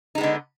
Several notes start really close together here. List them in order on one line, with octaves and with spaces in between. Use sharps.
D#4 G#3 B3 D3